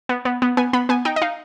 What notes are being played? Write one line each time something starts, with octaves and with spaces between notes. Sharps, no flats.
B3
B3
B3
B3 G#5
B3 B5
B3 G#5
D#4 G5
D#5
D#4 F5